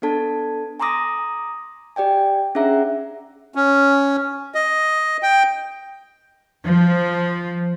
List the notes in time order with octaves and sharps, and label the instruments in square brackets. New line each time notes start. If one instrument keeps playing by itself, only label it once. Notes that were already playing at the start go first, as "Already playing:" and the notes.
[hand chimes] B3 D4 A4 A5 G#6
G#5 A#5 C6 D6 D#6 A#6
G4 D5 G5 G#5
C#4 D4 G#4 E5 F#5 A#5
[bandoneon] C#4
D#5
G5
[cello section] F3